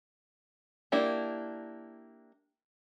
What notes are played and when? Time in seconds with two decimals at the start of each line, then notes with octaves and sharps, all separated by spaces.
0.92 A#3 D4 E4 G4